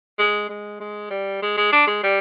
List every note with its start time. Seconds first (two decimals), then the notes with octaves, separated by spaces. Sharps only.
0.18 G#3
0.49 G#3
0.80 G#3
1.10 G3
1.42 G#3
1.57 G#3
1.72 D4
1.87 G#3
2.03 G3